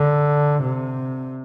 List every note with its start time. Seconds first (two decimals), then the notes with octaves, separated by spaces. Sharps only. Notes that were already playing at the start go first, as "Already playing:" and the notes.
Already playing: D3
0.63 C3